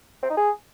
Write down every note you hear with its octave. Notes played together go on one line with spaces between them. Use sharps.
C4
D#4
G#4